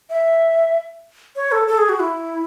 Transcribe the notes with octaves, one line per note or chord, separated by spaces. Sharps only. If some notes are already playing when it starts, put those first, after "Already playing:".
E5
C#5
A4
A4
G#4
F#4
E4